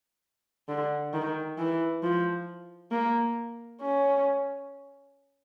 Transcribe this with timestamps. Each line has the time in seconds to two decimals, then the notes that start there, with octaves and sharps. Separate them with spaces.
0.69 D3
1.13 D#3
1.58 E3
2.03 F3
2.91 A#3
3.81 C#4